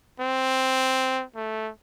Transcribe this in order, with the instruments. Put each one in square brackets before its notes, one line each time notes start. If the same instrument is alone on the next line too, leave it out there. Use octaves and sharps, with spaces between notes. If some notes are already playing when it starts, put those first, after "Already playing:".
[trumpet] C4
A3